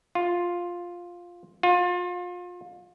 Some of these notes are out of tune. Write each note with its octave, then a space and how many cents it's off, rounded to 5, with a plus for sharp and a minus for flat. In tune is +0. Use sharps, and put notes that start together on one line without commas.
F4 +5
F4 +30